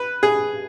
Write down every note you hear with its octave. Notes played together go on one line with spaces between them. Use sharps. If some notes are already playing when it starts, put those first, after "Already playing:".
Already playing: B4
G#4